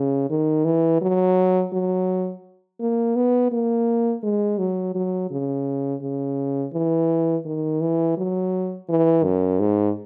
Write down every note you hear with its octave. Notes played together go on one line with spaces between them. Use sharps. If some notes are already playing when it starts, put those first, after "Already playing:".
Already playing: C#3
D#3
E3
F#3
F#3
A#3
B3
A#3
G#3
F#3
F#3
C#3
C#3
E3
D#3
E3
F#3
E3
F#2
G#2